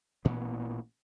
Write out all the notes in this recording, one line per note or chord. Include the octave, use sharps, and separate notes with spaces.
A1 A#2 E3 B3